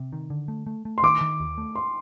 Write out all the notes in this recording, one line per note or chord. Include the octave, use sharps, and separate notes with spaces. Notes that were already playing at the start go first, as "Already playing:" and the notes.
Already playing: C3
D#3
D3
A3
A3
A3
C6
D#3 D6
D#3
D#2
A3
C6